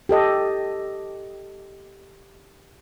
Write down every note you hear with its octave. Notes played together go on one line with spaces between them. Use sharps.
G4 A4 D#5